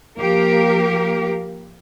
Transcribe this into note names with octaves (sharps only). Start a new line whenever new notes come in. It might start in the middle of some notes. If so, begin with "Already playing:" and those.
F3 A#3 G4 A#4